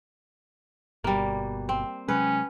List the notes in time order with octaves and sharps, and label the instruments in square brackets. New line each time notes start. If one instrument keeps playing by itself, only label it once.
[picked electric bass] G1 B2 [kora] G3 A#3
[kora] C4
[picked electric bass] C3 F#3 G#3 [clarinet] C#4 [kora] B4